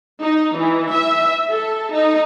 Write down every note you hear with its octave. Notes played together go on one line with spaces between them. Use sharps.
D#4
E3
E5
A4
D#4